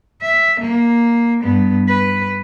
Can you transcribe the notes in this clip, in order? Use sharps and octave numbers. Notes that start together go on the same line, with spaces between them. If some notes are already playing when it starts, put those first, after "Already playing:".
E5
A#3
G2 B3
B4